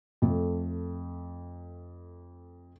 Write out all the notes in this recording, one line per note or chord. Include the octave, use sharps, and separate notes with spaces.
F2 A3